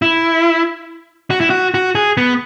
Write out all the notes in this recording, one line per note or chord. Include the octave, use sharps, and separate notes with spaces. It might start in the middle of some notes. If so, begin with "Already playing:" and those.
E4
F#4
E4
F#4
F#4
G#4
B3